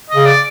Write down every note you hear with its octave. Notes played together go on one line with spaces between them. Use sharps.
C#3 D#5
D5